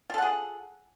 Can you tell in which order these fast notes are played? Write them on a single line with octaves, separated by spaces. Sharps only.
F4 A4 F#5 G#4